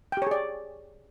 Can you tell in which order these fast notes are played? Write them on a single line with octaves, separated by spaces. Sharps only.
G5 G4 C#5 G#4 D5